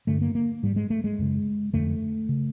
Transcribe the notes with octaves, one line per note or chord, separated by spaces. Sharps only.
G2 D3 A3
A#3
A#3
G#2 G3
G#3
A3
G#3
F#2 C#3
F2 D3 A3
C#3